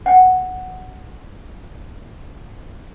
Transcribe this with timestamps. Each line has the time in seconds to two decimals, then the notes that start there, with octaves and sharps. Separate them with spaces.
0.06 F#5 G5